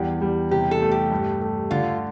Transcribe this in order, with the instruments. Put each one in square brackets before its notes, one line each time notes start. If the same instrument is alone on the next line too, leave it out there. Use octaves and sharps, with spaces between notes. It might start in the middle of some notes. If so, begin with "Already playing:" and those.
Already playing: [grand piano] E2 G3 [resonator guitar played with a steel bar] G4
[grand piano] G3
[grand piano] C3 [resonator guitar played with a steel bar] G4
[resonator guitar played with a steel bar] A4
[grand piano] A3
[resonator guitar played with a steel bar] G4
[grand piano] G2
A3
[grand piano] D3 [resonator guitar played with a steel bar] F4